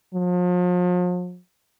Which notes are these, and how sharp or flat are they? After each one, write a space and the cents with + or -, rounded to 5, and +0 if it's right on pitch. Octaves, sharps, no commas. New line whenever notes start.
F3 +40